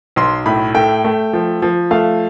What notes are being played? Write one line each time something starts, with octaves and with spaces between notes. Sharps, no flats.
B1 C6
A2 B5
A3 G5
A3
F3
F3
A3 F5